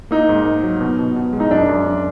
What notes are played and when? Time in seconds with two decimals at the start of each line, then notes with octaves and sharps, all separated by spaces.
0.11 A#3 D#4
0.29 G#2
0.46 A#3
0.63 F#3
0.81 B2
0.99 B2
1.16 B2
1.33 G#3
1.40 D#4
1.51 F#2 D4
1.68 F#2
1.86 F#2